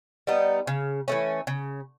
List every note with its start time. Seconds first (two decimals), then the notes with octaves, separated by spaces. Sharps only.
0.27 G3 B3 D#4
0.67 C#3
1.08 E3 A3 C#4
1.47 C#3